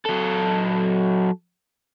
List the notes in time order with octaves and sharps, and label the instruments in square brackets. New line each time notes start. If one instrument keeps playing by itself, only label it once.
[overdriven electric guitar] F#3 A4